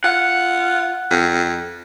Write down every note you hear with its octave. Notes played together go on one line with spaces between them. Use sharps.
F4 F#5
F2